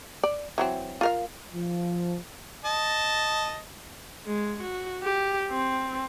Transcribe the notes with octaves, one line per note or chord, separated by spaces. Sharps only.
D5
E3 F#3 C4
F4 A#4 F5
F3
D#5 A5
G#3
F#4
G4
C4